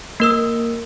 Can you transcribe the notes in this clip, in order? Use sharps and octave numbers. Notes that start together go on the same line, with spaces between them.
A#3 A#4 E6